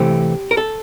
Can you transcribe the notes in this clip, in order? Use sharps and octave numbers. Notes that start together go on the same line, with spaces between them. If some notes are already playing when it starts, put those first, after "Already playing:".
Already playing: C3 E3 A3 C4 G4
A#4
A4